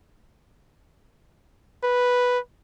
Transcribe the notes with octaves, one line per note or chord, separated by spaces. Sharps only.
B4